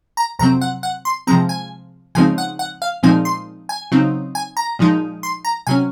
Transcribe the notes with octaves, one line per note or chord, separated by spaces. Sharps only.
A#5
F2 C3 F#3 C4 A#5
F#5
F#5
C6
C3 F3 G#3 C4 A#5
G#5
C#3 F3 G#3 C4 D#4 G#5
F#5
F#5
F5
A#2 F3 G#3 C4 D#4 G#5
C6
G#5
C#3 F#3 C4 D#4
G#5
A#5
A#2 F3 G#3 D#4
C6
A#5
C3 F#3 C#4 G#5